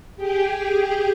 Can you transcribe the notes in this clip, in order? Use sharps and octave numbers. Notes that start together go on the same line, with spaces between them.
G4 G#4 G5